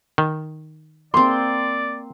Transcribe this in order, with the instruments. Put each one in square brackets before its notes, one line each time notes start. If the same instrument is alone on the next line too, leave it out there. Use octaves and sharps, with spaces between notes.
[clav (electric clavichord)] D#3
[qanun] A#3 C4 [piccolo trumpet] D5 [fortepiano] C6